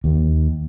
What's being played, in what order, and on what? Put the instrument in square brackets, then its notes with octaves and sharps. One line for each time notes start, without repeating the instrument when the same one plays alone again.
[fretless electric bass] D#2